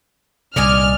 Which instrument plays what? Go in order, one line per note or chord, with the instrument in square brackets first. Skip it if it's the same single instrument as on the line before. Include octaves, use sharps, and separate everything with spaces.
[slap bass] C2 A#2 [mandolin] D5 D#5 G#5 [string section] F6